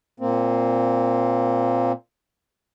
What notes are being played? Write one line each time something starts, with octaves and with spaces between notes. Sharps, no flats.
A#2 A#3 C4